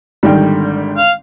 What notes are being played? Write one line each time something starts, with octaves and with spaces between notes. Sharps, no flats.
G#1 D3 D#3 G3 G5
F5